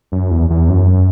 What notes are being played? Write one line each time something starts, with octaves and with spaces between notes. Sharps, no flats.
F#2
E2
E2
F#2